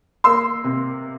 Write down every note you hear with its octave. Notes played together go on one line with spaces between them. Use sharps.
A#3 C6 E6
C3